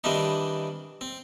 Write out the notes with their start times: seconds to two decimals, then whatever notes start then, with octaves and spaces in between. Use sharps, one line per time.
0.04 D#3 E3 G3 C4 D4 D#4
1.01 C4